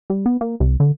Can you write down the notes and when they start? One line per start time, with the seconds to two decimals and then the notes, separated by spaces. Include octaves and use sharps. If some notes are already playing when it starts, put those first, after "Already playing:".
0.10 G3
0.26 B3
0.41 A#3
0.60 C2
0.80 D3